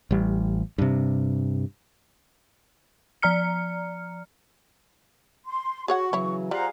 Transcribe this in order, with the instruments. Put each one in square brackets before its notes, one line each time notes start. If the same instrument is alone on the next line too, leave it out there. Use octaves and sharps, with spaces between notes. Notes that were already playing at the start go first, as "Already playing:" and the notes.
[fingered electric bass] A1 G3
G2 C3
[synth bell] F3 D5 A#5 F6 C#7
[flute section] C6
[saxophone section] F#4 [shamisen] G#4 C#5 F#5 [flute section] C#6
[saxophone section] C#3 E3 F#3 [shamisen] E4 C#5
[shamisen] G3 [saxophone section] F4 F5 F#5 [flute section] G#4 C5 A#5